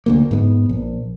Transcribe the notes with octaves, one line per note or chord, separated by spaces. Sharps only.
D2 F#3 A#3
G#2 A#3 B3
A#1